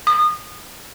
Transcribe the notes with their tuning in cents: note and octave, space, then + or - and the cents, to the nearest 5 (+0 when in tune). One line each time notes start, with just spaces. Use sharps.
D#6 -25